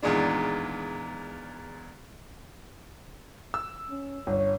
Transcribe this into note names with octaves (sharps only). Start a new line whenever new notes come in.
E2 A#2 D#3 G#3 D4
E6
C#4
G1 C#5